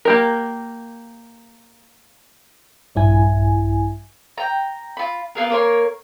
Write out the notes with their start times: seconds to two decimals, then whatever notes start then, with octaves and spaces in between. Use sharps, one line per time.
0.05 A#3 G4 A#4
2.95 A#1 G2 E4 G#5
4.38 G5 A#5
4.97 F4 B5
5.35 B3 F4 G#4 A#4
5.50 A#3 A#4 C#5 C6